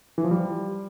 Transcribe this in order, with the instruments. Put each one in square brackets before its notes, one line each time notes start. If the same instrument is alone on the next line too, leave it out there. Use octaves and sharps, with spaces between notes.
[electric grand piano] E3
F3
G3